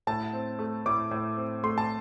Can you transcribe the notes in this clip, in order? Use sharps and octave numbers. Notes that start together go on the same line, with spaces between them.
A2 A5
C4
A3
A2 D6
A2
C4
A3 C6
A5